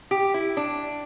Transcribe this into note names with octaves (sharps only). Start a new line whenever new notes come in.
G4
E4
D4